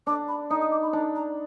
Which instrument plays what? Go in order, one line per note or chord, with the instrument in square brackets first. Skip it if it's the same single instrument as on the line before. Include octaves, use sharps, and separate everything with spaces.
[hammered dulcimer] D4 [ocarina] D6
[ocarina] B5
[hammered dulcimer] D#4 [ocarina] D#6
[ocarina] D#6
D6
B5
[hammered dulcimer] D4 [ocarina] A#5
[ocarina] A#5